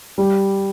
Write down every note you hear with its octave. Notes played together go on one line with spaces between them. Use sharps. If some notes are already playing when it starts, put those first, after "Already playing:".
G3